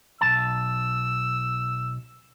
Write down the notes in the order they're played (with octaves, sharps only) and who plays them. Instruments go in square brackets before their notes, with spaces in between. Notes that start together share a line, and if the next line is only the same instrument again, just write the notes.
[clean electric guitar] B1 D#3 A5 [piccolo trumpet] E6